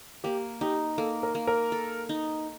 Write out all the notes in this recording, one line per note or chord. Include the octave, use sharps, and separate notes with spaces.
A#3 G4
D#4 G4
A#3 A4
A#4
A#3
A#4
A4
D#4